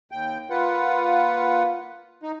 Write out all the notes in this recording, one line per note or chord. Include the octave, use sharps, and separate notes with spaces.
D#2 G5
A#3 F4 B4 F#5
D#4